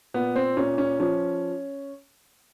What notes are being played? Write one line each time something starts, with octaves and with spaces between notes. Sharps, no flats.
A#2 B3
C4
A#2 C#4
C#4
F3 C#4